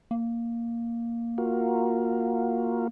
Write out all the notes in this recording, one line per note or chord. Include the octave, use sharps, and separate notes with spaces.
A#3
F4 F#4 A#4